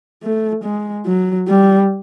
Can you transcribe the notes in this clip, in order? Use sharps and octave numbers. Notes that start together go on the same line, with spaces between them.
A3
G#3
F#3
G3